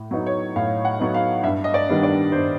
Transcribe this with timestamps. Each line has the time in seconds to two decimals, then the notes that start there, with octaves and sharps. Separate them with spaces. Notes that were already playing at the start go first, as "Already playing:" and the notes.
Already playing: A2
0.11 F#3 B3 D#4
0.26 C#5
0.56 A2 F5
0.85 F#5
1.00 F#3 B3 D#4
1.14 F5
1.43 G2 E5
1.64 D#5
1.74 D5
1.89 D#3 G3 B3 D4
2.03 D5
2.32 G2 C5